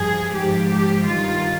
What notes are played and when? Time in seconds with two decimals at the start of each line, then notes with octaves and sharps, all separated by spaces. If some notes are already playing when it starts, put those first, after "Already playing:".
Already playing: G2 F3 G#4
0.36 G#2 F3 G4
0.72 G4
1.06 G2 D#3 F4